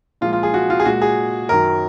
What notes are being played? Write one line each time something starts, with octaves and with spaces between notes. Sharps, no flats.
A#2 F3 G#3 F4
F4
G#4
F#4
F4
G#4
A#2 G#3 F#4
G#4
F#2 D#3 F#3 A#4